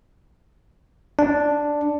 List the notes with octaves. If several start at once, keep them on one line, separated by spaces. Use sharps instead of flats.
D4